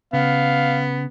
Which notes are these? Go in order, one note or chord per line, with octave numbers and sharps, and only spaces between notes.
C#3 B3 F5